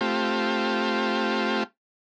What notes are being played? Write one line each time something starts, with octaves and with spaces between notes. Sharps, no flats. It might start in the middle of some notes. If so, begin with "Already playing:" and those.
A3 C4 F4 G4